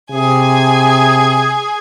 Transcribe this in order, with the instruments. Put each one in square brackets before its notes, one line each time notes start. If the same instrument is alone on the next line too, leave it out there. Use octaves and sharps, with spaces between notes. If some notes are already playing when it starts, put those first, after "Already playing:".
[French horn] C3 [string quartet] G#4 G#5